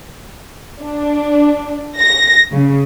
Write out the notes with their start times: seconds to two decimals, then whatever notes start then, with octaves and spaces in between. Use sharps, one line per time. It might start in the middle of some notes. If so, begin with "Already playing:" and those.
0.81 D4
1.99 A#6
2.52 C#3